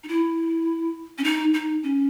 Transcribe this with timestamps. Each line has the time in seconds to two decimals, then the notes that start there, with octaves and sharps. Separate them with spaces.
0.04 D#4
0.08 E4
1.18 C#4
1.24 D#4
1.54 D#4
1.83 C#4